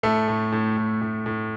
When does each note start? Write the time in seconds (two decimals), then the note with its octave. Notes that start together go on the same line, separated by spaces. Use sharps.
0.03 A2 A3 A4
0.28 A2
0.52 A2
0.77 A2
1.01 A2
1.26 A2